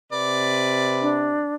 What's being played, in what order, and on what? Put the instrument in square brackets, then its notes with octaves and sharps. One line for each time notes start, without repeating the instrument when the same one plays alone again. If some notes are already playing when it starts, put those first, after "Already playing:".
[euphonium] C3 [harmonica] B4 D5
[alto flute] D4